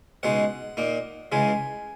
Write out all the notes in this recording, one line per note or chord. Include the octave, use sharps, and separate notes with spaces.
C#2 B2 G#3 D#4 F#5
A#2 A#3 D#4
C#2 C#3 E3 G#3 G#5